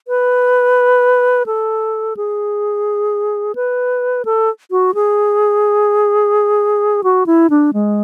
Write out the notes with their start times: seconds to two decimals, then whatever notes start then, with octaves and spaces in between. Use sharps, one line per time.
0.08 B4
1.46 A4
2.17 G#4
3.55 B4
4.25 A4
4.71 F#4
4.94 G#4
7.04 F#4
7.26 E4
7.50 D4
7.73 G#3